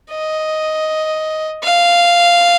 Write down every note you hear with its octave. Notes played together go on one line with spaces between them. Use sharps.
D#5
F5